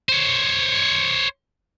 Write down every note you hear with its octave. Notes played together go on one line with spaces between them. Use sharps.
C5 C#5